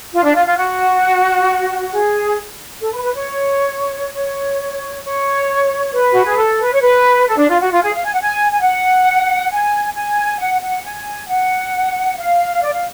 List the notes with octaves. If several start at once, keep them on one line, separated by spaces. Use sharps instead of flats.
F4
D4
F4
F4
F#4
G#4
A4
B4
B4
C#5
C#5
C#5
B4
F#4
G#4
A4
B4
C#5
B4
A4
D4
F4
F#4
F4
G#4
F5
G#5
F#5
G#5
G#5
F#5
G#5
G#5
F#5
F#5
G#5
F#5
F5
D5
F5